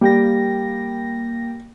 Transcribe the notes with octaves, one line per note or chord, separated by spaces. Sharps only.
G3 A#3 G5 A#6